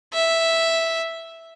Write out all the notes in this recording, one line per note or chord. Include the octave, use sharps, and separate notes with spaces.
E5